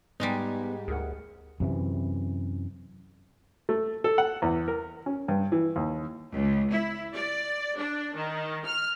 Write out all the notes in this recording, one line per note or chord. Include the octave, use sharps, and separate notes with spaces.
G#2 G3 G#3 B3 D#4
D2 G#4 A#4 F#5
F#2 C3 E3
A3
A4
F#5
E2
A#4
C#4
G2
E3
D#2
C#2
E4
D5
D4
D#3
F6